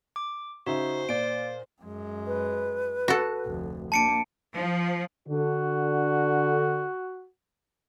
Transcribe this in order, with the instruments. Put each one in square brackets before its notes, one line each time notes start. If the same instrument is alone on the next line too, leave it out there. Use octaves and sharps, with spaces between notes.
[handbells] D6
[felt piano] C#3 D#4 E5 [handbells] F#4 [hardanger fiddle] C5
[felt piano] A#2 [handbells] D5 D7
[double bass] F#2 G#3
[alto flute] B4
[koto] F#4 A4
[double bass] F1 D2
[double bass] A#3 D4 [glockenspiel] A5 C#7 D7
[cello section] F3
[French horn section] D3 [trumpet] F#4